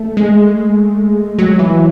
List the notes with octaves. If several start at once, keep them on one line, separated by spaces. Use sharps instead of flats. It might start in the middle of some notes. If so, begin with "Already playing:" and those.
Already playing: A3
G#3
F#3
E3